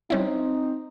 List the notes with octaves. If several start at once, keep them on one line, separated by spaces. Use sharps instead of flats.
G3 C4 C#4 D#4 E4